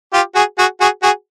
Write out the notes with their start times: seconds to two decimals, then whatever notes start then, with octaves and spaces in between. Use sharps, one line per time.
0.14 F4 G4
0.35 F#4 G#4
0.59 F#4 G#4
0.81 F#4 G#4
1.03 F#4 G#4